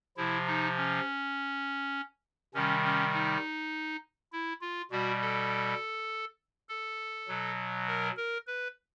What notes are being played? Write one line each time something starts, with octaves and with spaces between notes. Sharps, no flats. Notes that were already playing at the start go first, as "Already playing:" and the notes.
C3 F3 E4
D#4
C#4
C3 D#3 G3 C#4
C#4
D#4
E4
F4
B2 G3 F#4
A4
A4
B2 F#3
A#4
A#4
B4